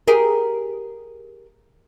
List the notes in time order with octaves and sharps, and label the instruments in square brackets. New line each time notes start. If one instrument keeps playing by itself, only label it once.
[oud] G4 G#4 A#4